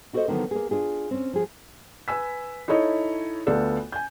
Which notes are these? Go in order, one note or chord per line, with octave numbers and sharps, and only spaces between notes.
E4 F#4 A4 A#4 C5 D#5
D3 D#3 F3 F#3 A#3 B3
A#3 G#4
D4 F4 G#4
C4 C#4
F3 G#4
B4 G#5 E6 B6
D#4 E4 A4 C#5 D#5
D2 B3 F4 A4 D5
G#5 G6